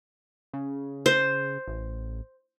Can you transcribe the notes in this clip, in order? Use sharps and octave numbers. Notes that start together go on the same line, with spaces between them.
C#3
C5
A1